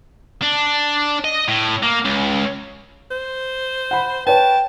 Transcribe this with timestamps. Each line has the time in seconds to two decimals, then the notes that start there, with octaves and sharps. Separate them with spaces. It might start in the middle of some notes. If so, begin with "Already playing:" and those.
0.43 D4
1.25 D#5
1.48 A2
1.83 A#3
2.05 C#2
3.11 C5
3.91 F#5 B5
4.27 B4 C#5 G5 A5